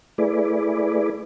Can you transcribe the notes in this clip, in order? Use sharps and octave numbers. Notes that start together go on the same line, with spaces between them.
A3 E4 G#4 B4 D5